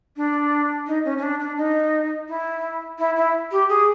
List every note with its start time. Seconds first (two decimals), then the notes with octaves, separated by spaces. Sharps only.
0.16 D4
0.87 D#4
1.04 C#4
1.18 C#4
1.22 D4
1.39 D4
1.57 D#4
2.28 E4
2.98 E4
3.16 E4
3.51 G4
3.69 G#4